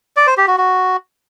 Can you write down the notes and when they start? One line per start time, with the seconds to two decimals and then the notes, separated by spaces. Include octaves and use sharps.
0.17 D5
0.27 C5
0.37 G4
0.48 F#4
0.58 F#4